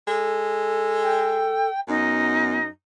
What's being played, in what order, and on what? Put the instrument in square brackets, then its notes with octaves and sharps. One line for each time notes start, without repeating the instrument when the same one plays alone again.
[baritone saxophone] G#3 [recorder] A4
[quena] G5
[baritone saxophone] F#2 [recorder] B3 [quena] D#4